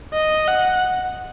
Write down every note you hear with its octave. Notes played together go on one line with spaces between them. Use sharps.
D#5
F#5